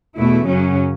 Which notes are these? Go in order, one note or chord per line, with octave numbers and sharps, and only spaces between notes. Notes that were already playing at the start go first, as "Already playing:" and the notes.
E2 B2 A3 E4
F#2 C#3 F#3 C#4